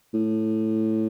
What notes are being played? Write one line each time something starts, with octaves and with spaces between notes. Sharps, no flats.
A2